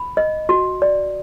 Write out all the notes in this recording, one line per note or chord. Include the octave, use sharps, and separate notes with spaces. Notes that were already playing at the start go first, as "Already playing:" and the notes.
Already playing: B5
D#5
F#4
D5